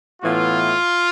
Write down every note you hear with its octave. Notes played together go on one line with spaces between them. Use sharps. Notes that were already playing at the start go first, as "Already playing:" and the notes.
A2 E3 B3 F4